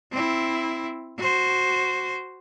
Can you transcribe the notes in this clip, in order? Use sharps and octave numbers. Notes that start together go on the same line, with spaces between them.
C4 E4
F#4 C5